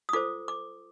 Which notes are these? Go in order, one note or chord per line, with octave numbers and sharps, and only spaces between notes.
D#6
F4 A4 C5 D6
D6